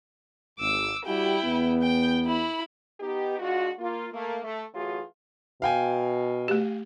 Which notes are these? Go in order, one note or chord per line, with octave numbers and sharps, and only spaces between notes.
G#1 D6 E6
G3 E4 F#4 G4 G5
E2 B3
G5 G6
E4 B5
B3 D#4 G4
G#3 D4 F4 F#4
A#3 F4
A3 A#3
A3
E3 F#3 A3 F4 F#4 G#4
B2 F5 G5 G#5
A3 G4